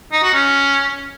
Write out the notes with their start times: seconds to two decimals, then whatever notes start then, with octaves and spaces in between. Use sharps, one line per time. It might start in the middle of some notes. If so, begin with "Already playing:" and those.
0.12 D#4
0.23 F#4
0.34 C#4